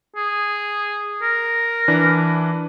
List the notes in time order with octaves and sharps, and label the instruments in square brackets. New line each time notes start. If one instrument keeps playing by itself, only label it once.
[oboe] G#4
A#4
[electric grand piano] E3 D4 B4